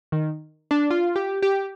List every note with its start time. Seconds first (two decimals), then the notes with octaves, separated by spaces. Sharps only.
0.12 D#3
0.71 D4
0.90 F4
1.16 G4
1.42 G4